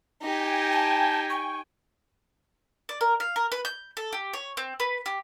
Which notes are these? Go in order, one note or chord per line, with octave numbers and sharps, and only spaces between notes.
D#4 G4 G5 G#5
A5
C#6
D5
A#4
F5
A#4
B4
G6
A4
G4
C#5
C4
B4
G4